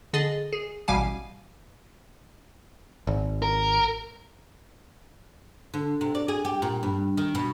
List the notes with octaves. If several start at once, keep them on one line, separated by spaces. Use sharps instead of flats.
D3 G#4 D#5 A6
G#4
A1 B2 G3 F5 G#5
G#1
A#4
D3
C3
D5
G#4
G4
A#2
G2
D#3
B2